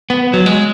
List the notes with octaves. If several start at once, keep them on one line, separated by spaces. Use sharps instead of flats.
B3
F#3
G#3